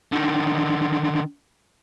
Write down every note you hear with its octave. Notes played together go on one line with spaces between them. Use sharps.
D3 D#3